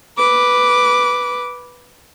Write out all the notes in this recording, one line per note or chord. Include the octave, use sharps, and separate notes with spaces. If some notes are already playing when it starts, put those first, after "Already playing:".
B4 D6